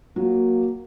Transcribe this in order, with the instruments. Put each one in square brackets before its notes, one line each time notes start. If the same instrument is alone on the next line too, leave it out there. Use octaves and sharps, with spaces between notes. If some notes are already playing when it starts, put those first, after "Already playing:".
[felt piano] F#3 [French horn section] A#3